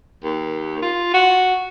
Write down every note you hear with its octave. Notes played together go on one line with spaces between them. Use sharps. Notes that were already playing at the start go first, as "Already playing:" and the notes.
D#2
F4
F#4